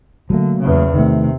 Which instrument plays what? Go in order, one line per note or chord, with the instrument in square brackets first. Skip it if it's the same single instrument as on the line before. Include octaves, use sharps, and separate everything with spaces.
[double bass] D3 [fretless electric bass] F#3 A3 A#3
[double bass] E2 C#3
[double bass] C3 [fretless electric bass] D#3 A3